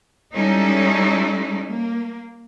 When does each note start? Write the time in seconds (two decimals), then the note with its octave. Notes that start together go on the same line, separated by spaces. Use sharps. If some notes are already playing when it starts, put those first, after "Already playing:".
0.34 G3 G#3 C#4 D#4 E4 A4
1.68 A#3